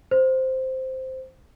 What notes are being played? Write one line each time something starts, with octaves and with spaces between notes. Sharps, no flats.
C5